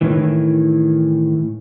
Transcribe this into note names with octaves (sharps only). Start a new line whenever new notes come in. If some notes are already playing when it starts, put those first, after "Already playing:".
A2 D#3 E3